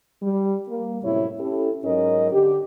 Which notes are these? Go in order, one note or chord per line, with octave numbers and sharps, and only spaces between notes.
G3
A#3
F#2 A2 C3 E4 C#5
C#4 E4 G4 A4
G#2 F#3 C#4 D#4 A#4 D#5
D3 G4